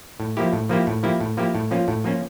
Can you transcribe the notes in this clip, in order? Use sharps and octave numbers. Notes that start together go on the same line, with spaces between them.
A2
F3 A#3 E4 G4
A2
F3 A#3 E4 G4
A2
F3 A#3 E4 G4
A2
F3 A#3 E4 G4
A2
F3 A#3 C#4 F4
A2
F3 A#3 C#4 F4